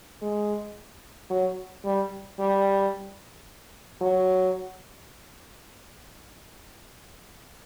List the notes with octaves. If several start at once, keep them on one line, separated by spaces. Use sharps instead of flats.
G#3
F#3
G3
G3
F#3